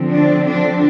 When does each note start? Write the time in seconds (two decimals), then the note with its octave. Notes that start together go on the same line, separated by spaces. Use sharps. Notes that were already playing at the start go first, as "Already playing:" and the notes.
Already playing: D3 F3 C4
0.12 D4
0.47 D4